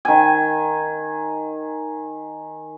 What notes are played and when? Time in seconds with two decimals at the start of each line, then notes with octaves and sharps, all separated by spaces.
0.05 D#3 G#5